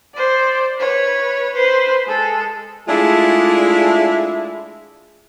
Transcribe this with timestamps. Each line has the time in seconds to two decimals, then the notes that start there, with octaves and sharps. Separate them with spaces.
0.14 C5 D5
0.78 B4 C#5
1.54 B4 C5
2.06 G#3 A4
2.88 G#3 A3 D4 E4 F4 G#4